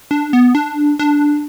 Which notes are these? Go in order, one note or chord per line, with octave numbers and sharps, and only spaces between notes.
D4
B3
D4
D4